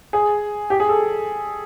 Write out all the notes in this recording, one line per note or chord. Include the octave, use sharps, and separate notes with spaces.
G#4
G4
G#4
A4